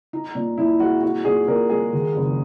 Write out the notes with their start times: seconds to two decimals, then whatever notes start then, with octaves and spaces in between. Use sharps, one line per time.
0.13 D#4
0.35 A#2
0.57 A#2 E4
0.80 G#3 F#4
1.02 D#4 F#4
1.25 A#2 G#4
1.47 A#2 A#4
1.70 G#3 G#4
1.93 D#3
2.15 F#1